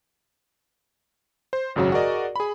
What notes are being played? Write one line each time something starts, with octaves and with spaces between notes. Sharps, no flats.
C5
G#1 F#2 C#3 F#3 F#4
F#4 G#4 A#4 D5 D#5
G#4 B5